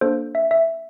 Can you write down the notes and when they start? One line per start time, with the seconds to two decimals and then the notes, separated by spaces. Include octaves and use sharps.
0.01 A#3 D4 A4 C5
0.35 E5
0.51 E5